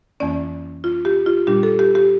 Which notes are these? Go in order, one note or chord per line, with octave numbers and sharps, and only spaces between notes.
F2 E3 A#3 C#4 D5
F4
G4
F4
A#2 G3 D4 G4
A4
G4
G4